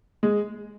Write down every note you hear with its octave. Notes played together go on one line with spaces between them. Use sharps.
G#3